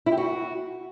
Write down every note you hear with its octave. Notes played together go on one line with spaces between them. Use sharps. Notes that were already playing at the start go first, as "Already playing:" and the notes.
E4
G4
F#4